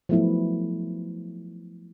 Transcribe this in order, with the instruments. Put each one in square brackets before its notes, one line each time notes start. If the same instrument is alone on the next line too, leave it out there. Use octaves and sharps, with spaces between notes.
[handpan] F3 F#3 A3 B3 E4